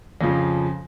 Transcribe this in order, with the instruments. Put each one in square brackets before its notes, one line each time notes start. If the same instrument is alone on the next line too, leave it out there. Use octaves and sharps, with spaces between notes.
[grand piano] F2 C#3 F3